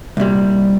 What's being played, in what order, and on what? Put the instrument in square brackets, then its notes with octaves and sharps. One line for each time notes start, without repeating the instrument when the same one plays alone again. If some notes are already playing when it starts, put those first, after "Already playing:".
[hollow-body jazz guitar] C2 A#2 G3